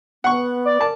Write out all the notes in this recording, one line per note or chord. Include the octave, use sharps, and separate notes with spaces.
B3 F#5 C#6
D5
A#4 A5